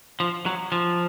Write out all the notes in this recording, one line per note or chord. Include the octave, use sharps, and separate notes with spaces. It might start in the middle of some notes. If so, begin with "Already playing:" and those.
F3
F#3
F3